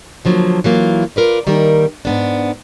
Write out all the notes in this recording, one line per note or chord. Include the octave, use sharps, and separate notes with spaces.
D3 F3 F#3 G#3 A#3
E3 F#3 A#3 F4
F4 A#4 B4 D5
D#3 G3 A#3 D#4 A#4
G#2 B3 D4